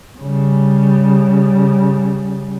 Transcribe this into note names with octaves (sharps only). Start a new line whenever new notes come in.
C#3 G3